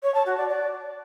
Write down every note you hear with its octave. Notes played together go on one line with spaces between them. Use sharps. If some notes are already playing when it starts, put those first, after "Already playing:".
C#5
A5
F#4
D5
D5